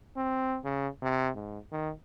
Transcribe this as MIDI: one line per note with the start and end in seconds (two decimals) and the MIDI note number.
0.17 0.58 60
0.65 0.88 49
1.02 1.30 48
1.35 1.59 44
1.72 1.91 51